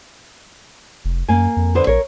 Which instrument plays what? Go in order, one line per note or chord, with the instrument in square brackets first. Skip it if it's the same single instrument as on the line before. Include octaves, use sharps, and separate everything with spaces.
[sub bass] F1
[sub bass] F#2 [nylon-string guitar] A#3 G#5
[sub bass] F2
[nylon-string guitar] D3 B3 C5
[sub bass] A#1 [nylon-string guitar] A#4 C#5